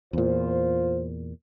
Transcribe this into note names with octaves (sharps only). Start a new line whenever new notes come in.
E2 A#2 F4 C5